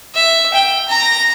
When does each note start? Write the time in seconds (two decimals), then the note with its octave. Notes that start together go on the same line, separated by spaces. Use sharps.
0.15 E5
0.54 G5
0.89 A#5